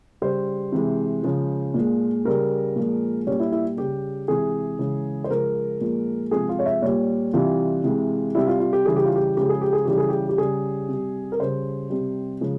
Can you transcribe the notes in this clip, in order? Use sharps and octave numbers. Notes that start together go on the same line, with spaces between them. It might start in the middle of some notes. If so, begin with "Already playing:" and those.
C#3 G3 C5
C3 E3 G#3
C#3 F3 G#3
A#2 G#3
C#3 G3 A#4
A#2 F3 G#3
A#2 G3 C#4
E4
E4
C#3 G3 G4
C3 E3 G#3 G#4
C#3 E3 G#3
C5
C#3 F3 G#3 A#4
A#2 F3 G#3
C3 F3 G#3 G#4
F4
C#5
E5
A#2 G3 C#5
C3 E3 G3 F4
C3 E3 G#3
C3 G3 E4
F4
F4
G4
C#3 E3 G3 G#4
G4
F4
G4
C#3 F3 G#3 G4
G#4
G4
G#4
C#3 E3 G3 G4
G#4
G4
G4
C#3 G3 G#4
C3 G3
A#4
C#3 G3 C5
C3 G3
C#3 F3 G#3